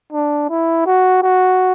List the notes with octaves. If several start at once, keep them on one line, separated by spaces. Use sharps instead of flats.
D4
E4
F#4
F#4